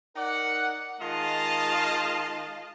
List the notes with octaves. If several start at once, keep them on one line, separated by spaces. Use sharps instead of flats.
D#4 A#4 D5 F#5
D#3 G#3 F4 D#5 F5 A5